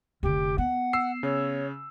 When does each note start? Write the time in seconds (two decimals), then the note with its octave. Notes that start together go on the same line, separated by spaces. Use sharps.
0.23 F1 D3 G4
0.58 B3 F#5
0.93 E6 C7
1.23 C#3 C#5